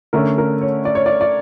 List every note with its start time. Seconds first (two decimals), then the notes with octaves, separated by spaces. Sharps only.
0.13 D3 A3 C#4 A#4
0.38 A#4
0.61 C#5
0.85 D5
0.95 C#5
1.06 D5
1.21 D5